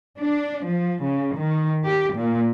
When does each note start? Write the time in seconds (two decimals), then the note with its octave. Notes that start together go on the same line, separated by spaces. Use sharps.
0.20 D4
0.67 F3
1.05 C#3
1.38 D#3
1.86 G4
2.16 A#2